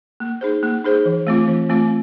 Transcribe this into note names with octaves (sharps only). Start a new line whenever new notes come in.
A#3
D#4 G#4 C5
A#3
D#4 G#4 C5
E3
A3 C4 F4
E3
A3 C4 F4